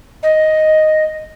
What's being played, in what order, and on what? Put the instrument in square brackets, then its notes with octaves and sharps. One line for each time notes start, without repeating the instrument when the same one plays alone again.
[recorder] D#5